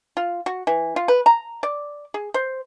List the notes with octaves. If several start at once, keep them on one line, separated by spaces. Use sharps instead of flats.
F4
F#4
E3
F4
B4
A#5
D5
G#4
C5